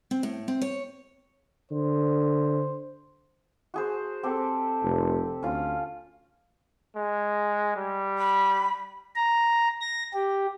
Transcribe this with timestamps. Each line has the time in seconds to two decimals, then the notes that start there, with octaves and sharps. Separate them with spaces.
0.11 C4
0.23 A2
0.48 C4
0.61 C#5
1.71 D3 C5
3.74 F#4 G#4 C5
4.23 C4 G4 A4
4.83 F1
5.43 D2 C#4 F4
6.96 G#3
7.76 G3
8.18 B5
9.16 A#5
9.81 A#6
10.13 G4